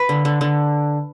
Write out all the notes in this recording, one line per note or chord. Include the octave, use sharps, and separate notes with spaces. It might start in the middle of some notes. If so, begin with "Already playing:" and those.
Already playing: B4
D3
D3
D3